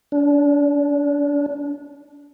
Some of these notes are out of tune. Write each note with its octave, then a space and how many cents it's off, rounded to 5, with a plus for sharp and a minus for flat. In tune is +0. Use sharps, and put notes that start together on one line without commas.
D4 -35